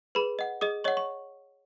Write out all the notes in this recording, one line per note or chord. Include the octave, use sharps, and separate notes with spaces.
G#4 B4 B5
D#5 F#5
G#4 D#5 D#6
C#5 D#5 F#5 C#6
C#6